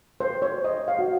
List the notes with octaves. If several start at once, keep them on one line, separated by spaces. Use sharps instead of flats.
C5
C#5
D#5
F5
F#4